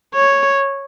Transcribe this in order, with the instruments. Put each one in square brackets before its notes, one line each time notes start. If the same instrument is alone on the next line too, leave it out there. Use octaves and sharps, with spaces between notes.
[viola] C#5